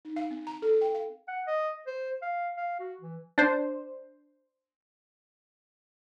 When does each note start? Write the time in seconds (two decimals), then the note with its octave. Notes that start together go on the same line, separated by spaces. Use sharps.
0.05 D#4
0.16 F5
0.31 C4
0.47 A#5
0.62 A4
0.81 G5
0.94 F5
1.28 F#5
1.47 D#5
1.87 C5
2.22 F5
2.57 F5
2.80 F#4
3.01 E3
3.38 D4 C5